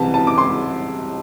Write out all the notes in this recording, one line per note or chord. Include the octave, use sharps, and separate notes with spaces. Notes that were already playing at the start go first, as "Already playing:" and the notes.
Already playing: C2 C3 E3 A5
A5
D6
C6